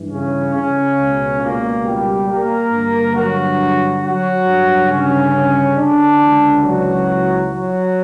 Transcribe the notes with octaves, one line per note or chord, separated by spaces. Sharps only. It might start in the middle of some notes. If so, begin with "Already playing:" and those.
Already playing: G2 E3
C#3 C#4
C#3 C#4
C#2 B2
A#2 A#3
G3 G4
A#3 A#4
G2 D3
F#3 F#4
F#3 F#4
G2 D3
C#3 C#4
D3 D4
C#2 C#3 E3
F#3 F#4
F#3 F#4